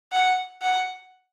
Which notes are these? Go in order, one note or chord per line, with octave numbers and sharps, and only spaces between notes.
F#5
F#5